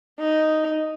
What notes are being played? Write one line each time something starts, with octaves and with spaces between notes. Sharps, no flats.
D#4